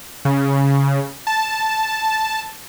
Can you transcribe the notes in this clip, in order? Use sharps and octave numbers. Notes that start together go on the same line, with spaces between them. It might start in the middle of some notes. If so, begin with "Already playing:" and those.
C#3
A5